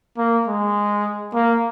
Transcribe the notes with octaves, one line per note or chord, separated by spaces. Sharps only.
A#3
G#3
A#3